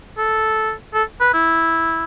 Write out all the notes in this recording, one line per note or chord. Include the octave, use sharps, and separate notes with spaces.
A4
A4
B4
E4